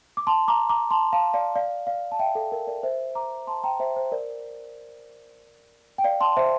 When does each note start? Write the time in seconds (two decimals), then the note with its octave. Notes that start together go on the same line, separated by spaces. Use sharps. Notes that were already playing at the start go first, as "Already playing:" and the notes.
0.17 D6
0.27 A5 C6
0.48 A#5 D6
0.69 A#5 D6
0.91 A5 C6
1.13 F5 A5
1.34 D5 F5
1.56 D5 F5
1.87 D5 F5
2.12 A5
2.19 E5 G5
2.35 A4
2.52 A#4
2.67 A#4 D5
2.83 C5 E5
3.15 A#5 D6
3.47 A5 C6
3.63 G5 A#5
3.80 C5 E5
3.96 C5
4.12 A#4 D5
5.98 G5
6.04 D5 F5
6.20 A5 C6
6.37 C5 E5